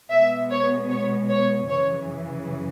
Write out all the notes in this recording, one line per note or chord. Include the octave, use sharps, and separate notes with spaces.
B2 G#3 B3 E5
C#5
C#5
C#5
F#2 C#3 E3 C#5